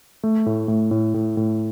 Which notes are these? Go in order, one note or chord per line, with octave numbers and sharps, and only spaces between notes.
A3
A2
A2
A2
A2
A2